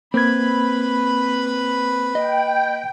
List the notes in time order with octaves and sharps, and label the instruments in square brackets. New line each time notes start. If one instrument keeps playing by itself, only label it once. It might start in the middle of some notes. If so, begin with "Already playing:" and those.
[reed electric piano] A#3 G#6 [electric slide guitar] C4 [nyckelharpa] B4 B5
[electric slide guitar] D#5 [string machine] G5